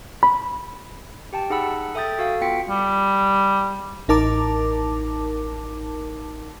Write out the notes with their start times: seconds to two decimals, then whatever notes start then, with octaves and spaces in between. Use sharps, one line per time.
0.23 B5
1.33 G4 G5 A5
1.50 D#4 G#4 F#5 B5 E6
1.95 A4 E5 G5 D#6 G6 A6
2.19 F#4 A4 F5
2.41 B3 F4 G5 B6 C#7
2.69 G3
4.08 A1 D#4 A#4 A5 D6